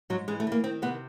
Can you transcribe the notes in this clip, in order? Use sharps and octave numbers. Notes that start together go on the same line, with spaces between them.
G#2 F#3
E3 G#3
A3
E3 A#3
D#3 C4
C3 B3